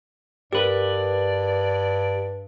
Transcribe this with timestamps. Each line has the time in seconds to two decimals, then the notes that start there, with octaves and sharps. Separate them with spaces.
0.53 G2 G4 A#4 B4 D5